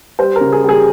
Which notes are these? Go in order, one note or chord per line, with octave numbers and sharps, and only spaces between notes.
G3 C5
A#4
C#3
G#4
G3
G#4